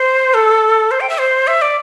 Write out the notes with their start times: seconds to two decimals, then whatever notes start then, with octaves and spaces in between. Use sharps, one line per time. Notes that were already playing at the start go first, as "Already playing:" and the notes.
Already playing: C5
0.34 A4
0.91 C5
1.01 G5
1.09 E5
1.19 C5
1.47 E5
1.62 D5